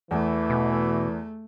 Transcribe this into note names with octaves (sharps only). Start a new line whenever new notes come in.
E2 E3 A3
B2